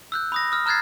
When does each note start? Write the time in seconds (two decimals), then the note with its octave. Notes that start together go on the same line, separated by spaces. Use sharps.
0.12 E6 F#6 G6
0.32 B5 D#6 A#6
0.52 D#6 F6
0.66 A#5 F6 F#6 G#6 A6 C7